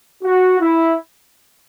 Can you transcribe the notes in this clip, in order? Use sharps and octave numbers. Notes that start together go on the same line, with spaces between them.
F#4
E4